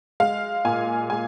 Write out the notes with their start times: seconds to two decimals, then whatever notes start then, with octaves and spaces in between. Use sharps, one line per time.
0.20 G#3 F5
0.65 A#2 G#5
1.10 G#3 G#5